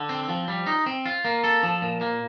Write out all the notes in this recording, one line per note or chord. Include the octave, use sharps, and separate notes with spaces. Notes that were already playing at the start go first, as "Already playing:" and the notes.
Already playing: D3
C4
F3
G3
D#4
C4
F4
A#3
A4
F3
A#2
A#3